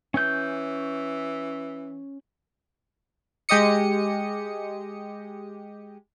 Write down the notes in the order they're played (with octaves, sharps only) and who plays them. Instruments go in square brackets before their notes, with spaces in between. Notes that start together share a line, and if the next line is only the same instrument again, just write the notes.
[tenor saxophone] E3 [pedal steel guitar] C#4 G6
[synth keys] G#3 G4 D#5 D#6 C#7